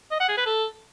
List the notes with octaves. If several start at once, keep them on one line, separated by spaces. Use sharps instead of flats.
D#5
F#5
G#4
B4
A4